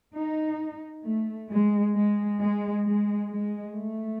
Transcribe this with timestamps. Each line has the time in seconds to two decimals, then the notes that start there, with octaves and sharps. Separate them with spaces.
0.15 D#4
1.04 A3
1.50 G#3
1.95 G#3
2.40 G#3
2.86 G#3
3.31 G#3
3.76 A3